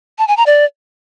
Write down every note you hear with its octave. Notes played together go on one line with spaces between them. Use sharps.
A5
G#5
A#5
D5